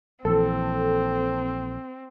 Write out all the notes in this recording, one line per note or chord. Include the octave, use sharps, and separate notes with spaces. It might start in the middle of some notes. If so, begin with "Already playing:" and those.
A#1 E3 C4 A4